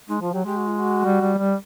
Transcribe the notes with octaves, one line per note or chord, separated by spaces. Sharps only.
G#3 D#4
F3 F4
F#3 G4
G#3 G4
F#4
F4
F#4
G3
G3
G3